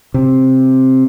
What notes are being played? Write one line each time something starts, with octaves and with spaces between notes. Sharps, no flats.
C3